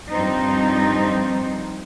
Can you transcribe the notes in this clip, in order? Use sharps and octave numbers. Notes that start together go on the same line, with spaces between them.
G2 F3 C4 D#4